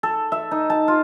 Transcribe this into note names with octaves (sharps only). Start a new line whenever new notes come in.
A4
E5
D#4
A5
F4